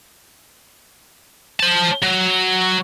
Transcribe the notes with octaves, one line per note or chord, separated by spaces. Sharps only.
C5 A5
F#3